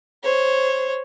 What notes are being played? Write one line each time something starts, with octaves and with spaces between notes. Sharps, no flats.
C5 C#5